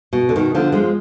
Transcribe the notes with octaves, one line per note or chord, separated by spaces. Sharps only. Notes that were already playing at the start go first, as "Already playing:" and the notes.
B2
D3
B2 D#3
D3 F3
F3 G#3